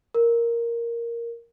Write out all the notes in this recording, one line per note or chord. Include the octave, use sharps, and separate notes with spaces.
A#4